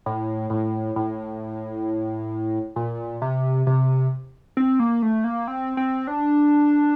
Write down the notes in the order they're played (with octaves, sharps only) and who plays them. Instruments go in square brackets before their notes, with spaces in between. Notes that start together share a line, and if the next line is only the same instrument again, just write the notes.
[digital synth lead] A2
A2
A2
A#2
C3
C3
C4
A#3
A3
A#3
C4
C4
D4